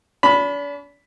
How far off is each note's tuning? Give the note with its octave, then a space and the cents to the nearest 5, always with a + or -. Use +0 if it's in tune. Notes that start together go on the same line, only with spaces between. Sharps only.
D4 -40 B5 +0